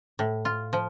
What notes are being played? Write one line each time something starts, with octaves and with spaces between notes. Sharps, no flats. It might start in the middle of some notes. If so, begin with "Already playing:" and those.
A2
F4
F3